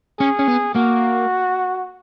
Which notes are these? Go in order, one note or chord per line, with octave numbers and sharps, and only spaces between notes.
C#4 G#4
C#4
B3
A#3 F#4